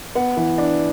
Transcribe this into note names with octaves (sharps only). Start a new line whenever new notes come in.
B3 F#5
E3
D4